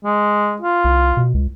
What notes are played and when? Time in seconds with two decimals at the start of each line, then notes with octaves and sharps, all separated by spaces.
0.04 G#3
0.62 F4
0.84 C2
1.17 B2
1.34 C#2